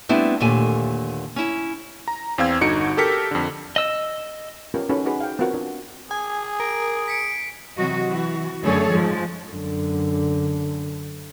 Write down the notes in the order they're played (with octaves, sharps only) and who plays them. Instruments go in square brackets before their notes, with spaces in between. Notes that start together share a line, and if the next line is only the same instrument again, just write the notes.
[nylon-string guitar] G3 A3 B3 C4 D4 E4
D#2 A#2 D3 A3 G#5
C#4 E4
[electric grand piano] A#5
E2 C4 F5 E6 G#6
G1 D3 D#4 F#4 C#7 D7
G4 A4 A#4 B6 C#7
F2 D3
[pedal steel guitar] D#5 E6
[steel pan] B3 C#4 F4 G4 A#4
C#4 D#4 F#4 A4 B4 F#5
C#4 D#4 F#4 G#4 B4
F5 G5
B3 C4 F4 F#4 A#4 F#5
D4 F4
[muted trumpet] G#4 [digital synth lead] G#5
[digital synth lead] A#4 [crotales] D7
[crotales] B6 C#7 D7
[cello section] C3 E3 F#3 F#4 D#5
E3 F#4
F#2 D3 A3 G#4 A4 C#5
G#2 F3 G#3
[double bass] F#2 D3